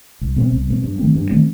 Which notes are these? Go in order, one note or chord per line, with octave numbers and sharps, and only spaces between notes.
C2
B2 A3 C4
C2
B2 A3 C4
G2
D#3 A3 C4
G2
D#3 A3 C4